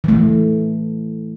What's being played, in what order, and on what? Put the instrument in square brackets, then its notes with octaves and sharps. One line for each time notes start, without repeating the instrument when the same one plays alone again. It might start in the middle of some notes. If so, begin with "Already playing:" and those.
[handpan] E3 A3